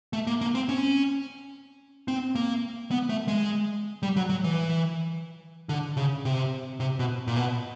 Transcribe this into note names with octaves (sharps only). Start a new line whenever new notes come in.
A3
A#3
A#3
C4
C#4
C4
A#3
B3
A3
G#3
G3
F#3
F#3
E3
D3
C#3
C3
C3
B2
A#2
B2